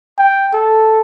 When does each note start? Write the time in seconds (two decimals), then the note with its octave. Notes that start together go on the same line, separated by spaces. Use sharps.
0.18 G5
0.53 A4